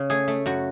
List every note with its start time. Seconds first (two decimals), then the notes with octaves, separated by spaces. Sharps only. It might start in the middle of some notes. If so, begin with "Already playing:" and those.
Already playing: C#3
0.10 A3 G#4
0.28 A3
0.46 F#2 F#4